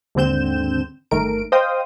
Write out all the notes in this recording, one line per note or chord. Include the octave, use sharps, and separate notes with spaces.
D#2 G#2 D3 C4 G6 E7
G1 D#3 A3 A#4 D7
C5 D#5 F5 G5 D#6